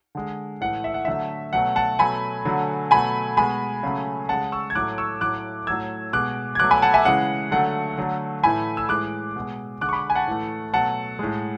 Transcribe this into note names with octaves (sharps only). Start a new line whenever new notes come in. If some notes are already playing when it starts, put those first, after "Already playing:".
D3 G#3
A2 E3 A3 F#5
E5
F#5
D3 F#3 A3 E5
B2 F#3 A3 F#5
F#5 A5
B2 F#3 A3 G#5 B5
D3 F#3 A3
B2 F#3 A3 G#5 B5
B2 G#3 G#5 B5
C#3 F#3 A3
C#3 G#3 F#5 A5
C#6 E6
G#6
A2 F#3 A3 D6 F#6
C#6 E6
A2 F#3 A3 D6 F#6
A2 F#3 A3 E6 G#6
B2 G#3 D6 F#6
G#6
B2 F#3 A3 D6 F#6
G#5 B5
F#5 A5
E5 G#5
C#3 E3 G#3 F#5
D3 F#3 A3 F#5
D3 F#3 A3
A2 E3 A3 G#5 B5
E6
A2 E3 G#3 D6 F#6
B2 G#3
D3 G#3 D6 F#6
C#6
B5 D6
G#5
F#5 A5
A2 E3 A3
B2 F#3 A3 F#5 A5
A2 G#3